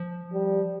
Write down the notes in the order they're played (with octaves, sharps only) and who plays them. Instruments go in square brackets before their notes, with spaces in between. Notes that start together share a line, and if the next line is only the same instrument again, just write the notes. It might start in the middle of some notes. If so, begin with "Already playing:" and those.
Already playing: [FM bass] F3
[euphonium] G3